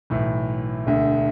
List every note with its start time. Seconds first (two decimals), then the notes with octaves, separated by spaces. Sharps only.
0.10 B1 A2 E3
0.86 E1 D2 D3